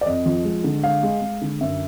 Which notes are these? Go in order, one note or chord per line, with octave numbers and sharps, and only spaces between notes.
D5
F2 D#5
F3
G#3
D3
G#3 F5
G#3
G#3
D3
F#2 E5